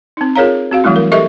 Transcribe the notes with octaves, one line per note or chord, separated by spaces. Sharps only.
C4 D#4
F4 G#4 A#4 C#5 F5 A#5
C4 F#4 F5
E3 F#3 G3 A3 E4
A#4
G4 A4 A#4 D#5 E5 C#6